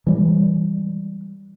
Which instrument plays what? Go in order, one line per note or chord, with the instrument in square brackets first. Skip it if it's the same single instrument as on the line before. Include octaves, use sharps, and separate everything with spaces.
[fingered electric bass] E3 G3 G#3